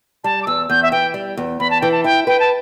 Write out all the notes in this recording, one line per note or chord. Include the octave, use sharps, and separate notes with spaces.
G3 A5
D6
E2 E6
E2 G6
E5
E3 G5
G3
E2
E2 B5
A5
E3 G5
A5
E4 G5
B4 G5
A5